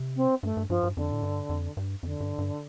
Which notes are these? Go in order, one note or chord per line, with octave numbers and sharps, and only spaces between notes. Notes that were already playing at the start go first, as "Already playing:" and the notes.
Already playing: C3
C4
G2 A3
G2
G2 F3
G2
F2 D3
A2
G2
F2
G2
F2 D3
G2
G2